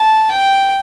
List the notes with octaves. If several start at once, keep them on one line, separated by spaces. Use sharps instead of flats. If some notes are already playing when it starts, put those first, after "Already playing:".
Already playing: A5
G5